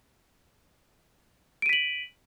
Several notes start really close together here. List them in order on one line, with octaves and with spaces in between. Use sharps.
D7 D#7 B6 F#7